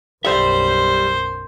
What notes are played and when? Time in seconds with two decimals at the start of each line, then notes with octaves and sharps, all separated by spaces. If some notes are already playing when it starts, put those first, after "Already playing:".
0.25 B1 F#2 G3 C5 E5